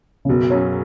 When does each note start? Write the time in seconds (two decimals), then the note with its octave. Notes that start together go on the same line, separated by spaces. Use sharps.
0.25 C#3
0.29 F#1 B2
0.50 F#2 C#3 F#3 C#4